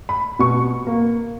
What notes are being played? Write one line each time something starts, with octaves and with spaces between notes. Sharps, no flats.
B5
B2 C#6
A#3